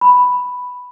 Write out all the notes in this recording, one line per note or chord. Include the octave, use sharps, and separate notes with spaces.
B5